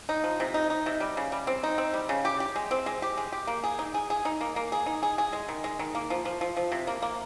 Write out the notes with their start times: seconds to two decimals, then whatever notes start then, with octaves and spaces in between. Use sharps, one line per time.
0.09 D#4
0.24 F3
0.40 C3
0.54 D#4
0.70 D#4
0.86 C3
1.01 G3
1.17 C#3
1.32 G3
1.47 C4
1.63 D#4
1.78 C4
1.94 G3
2.09 C#3
2.25 G4
2.40 G4
2.56 G#3
2.71 C4
2.86 G#3
3.02 G4
3.17 G#3
3.32 G4
3.47 A#3
3.63 G#4
3.79 D#4
3.94 G#4
4.10 G#4
4.25 D#4
4.41 A#3
4.56 A#3
4.72 G#4
4.86 D#4
5.03 G#4
5.18 G#4
5.33 G#3
5.48 D#3
5.64 G#3
5.79 D#3
5.95 A#3
6.10 F3
6.25 F3
6.41 F3
6.57 F3
6.72 C3
6.87 A#3
7.02 A#3